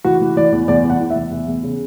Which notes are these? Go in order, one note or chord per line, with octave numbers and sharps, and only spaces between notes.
E3 F#4
E3
E3 D5
E2
E2 D5
E3
F#5
E3
E5
E2
E2
E2
C#3